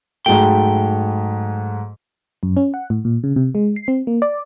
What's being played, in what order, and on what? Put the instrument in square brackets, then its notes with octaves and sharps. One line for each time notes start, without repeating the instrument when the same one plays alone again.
[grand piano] G#2 F#3 A3 [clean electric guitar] G5
[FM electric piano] F#2
C#4
F#5
A2
A#2
C#3
C3
G#3
C7
C4
A#3
D5